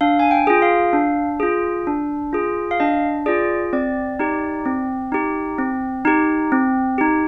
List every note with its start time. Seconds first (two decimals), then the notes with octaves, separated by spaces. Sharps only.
0.01 D4 F5
0.19 G#5
0.31 G5
0.47 F4 G#4
0.62 F5
0.93 D4
1.40 F4 G#4
1.87 D4
2.33 F4 G#4
2.71 F5
2.80 D4 D#5
3.26 F4 G#4 D5
3.73 C4 D5
4.19 D#4 G4
4.65 C4
5.12 D#4 G4
5.59 C4
6.05 D#4 G4
6.52 C4
6.98 D#4 G4